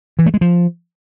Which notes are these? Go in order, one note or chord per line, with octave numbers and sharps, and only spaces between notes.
E3
A3
G#3
F3